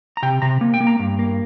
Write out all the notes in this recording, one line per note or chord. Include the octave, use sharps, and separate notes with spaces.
A#5
C3 G5
C3 A#5
A#3
G5
A#3
A#5
G2
A#3